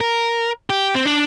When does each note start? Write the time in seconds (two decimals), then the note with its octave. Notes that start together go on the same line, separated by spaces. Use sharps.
0.01 A#4
0.70 G4
0.95 C4
1.05 D4